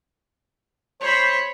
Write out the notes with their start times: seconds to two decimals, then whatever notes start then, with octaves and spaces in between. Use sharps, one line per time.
1.01 C5 C#5 B5